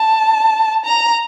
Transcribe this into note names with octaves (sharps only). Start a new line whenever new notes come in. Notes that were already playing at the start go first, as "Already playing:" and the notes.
Already playing: A5
A#5